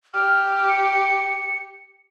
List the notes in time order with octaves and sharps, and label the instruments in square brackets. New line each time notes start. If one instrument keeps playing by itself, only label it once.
[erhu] G4 [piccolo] F6
[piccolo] C#7